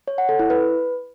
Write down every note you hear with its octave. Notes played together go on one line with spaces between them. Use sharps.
C#5
F#5
A4
E4
B4